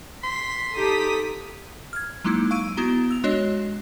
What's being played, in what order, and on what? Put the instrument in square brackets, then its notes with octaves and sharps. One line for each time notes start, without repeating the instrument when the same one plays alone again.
[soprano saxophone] C6 [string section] B6
[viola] D#4 G4 [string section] A4 D#6 B6
[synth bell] F6 G#6
F#3 G#3 A#3 D#4 E4
F5 C#6 E6 D7 D#7
B3 E4 F#4 A#5 G7
E6 F7
G#3 D4 F#4 C#5 D#5